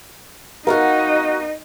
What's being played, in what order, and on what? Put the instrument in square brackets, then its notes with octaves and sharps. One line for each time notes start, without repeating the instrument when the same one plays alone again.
[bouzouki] B3 D#5 F5 [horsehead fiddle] D#4 [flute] F#4 [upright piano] A#4